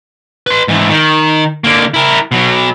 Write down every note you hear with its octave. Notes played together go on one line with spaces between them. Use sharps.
B4 C6
G#2 E3
D#3
D3 A#3
E4 A#4
B2 F#3